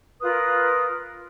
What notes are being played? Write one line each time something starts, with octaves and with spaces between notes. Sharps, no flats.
F4 A#4 B4 D#6